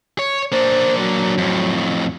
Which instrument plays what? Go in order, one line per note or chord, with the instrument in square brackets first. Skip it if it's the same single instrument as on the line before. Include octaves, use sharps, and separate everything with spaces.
[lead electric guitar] C#5
[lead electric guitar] A#3 D4 [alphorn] C5
[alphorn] F#3
[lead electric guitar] F2 A2